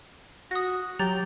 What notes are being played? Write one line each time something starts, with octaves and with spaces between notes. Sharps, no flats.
F#4 D#6 A#6
F#3 G4 A#5 A6